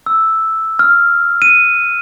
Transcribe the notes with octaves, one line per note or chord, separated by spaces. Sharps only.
E6
F6
D#7